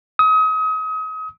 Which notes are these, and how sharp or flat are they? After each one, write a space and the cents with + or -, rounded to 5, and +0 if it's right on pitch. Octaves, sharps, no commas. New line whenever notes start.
D#6 +35